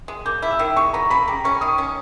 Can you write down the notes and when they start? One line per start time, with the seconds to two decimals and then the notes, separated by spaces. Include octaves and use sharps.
0.08 G#3
0.26 A#3 G6
0.42 E4
0.51 E6
0.59 D#3
0.76 G#3 C#6
0.93 B3 A#5
1.10 C#3 B5
1.28 G3 A#5
1.44 C#4 C#6
1.61 D#3 D#6
1.78 C#4